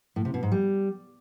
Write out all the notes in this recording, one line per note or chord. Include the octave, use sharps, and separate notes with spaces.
A2
C3
B2
G#2
G3